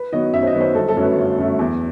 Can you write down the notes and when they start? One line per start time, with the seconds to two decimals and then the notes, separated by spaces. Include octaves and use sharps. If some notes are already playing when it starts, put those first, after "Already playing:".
Already playing: B4
0.12 D#3 F#3 B3 D#5
0.33 F#2 E5
0.43 C5
0.47 D#5
0.54 D#3 F#3 B3
0.61 C5
0.75 G1 A4
0.88 A4
0.96 F#2 F#3 A3
1.02 B4
1.17 G1
1.38 F#2 F#3 A3
1.59 E2